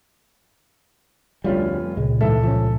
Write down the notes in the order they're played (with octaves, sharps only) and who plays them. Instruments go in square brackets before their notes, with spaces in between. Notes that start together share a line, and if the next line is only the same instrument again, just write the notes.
[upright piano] F1 C#4 F4 [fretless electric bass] D2 G3
[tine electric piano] C#2 A#2 [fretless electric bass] G#3
[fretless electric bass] A1 G#2 E3 [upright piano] A4 E5
[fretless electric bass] F3 C#4